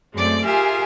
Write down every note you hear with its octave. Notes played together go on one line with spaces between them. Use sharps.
F#2 G#3 A3 C4 D5 D6
F4 G4 G#4 A#4 E5 G#5